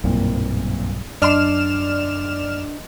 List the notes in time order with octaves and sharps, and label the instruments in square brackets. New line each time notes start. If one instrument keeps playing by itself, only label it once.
[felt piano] F#1 A#2 C4 [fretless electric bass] B1 G2
[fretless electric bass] F#2 [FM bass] D4 [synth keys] D5 F6 E7 [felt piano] D#5 C6